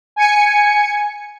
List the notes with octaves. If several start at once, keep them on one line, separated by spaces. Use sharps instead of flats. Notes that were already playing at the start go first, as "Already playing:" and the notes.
G#5 C#7